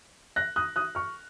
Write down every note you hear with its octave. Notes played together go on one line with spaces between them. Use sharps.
F#6 A#6
D#6 F#6
D#6 F#6
C#6 F6